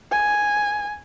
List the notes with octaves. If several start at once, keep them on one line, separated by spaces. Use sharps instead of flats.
G#5